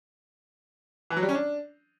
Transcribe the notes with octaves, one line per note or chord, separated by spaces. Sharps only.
E3
F#3
G3
C#4
D4